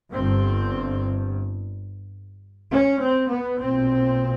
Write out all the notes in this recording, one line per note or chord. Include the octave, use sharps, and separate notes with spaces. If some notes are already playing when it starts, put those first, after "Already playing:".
G1 G2 C4
C#4
C4
B3
B1 A#2 C4